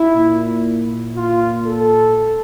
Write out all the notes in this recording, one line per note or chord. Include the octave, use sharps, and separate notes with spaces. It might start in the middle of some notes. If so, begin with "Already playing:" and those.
Already playing: E4
A#2
A#2 F4
A4